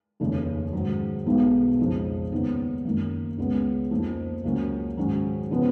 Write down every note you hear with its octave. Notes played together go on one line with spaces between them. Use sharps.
F1 D#2 C#3
G#2 D#3 F#3
B1 B2 G#3 B3 D#4
F2 C#3 F3 G#3 D#4
D#2 C#3 G#3 B3 D#4
F#2 D#3 A#3
C#2 C#3 G#3 B3
F2 F3 A#3 D#4
C#2 C#3 F#3 A#3 C#4
G#2 D#3 F#3 C#4
C#3 F3 B3